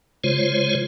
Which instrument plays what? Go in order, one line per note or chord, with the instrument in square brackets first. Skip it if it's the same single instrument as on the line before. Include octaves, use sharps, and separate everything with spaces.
[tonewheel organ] C#3 G#3 F4 C5 C#5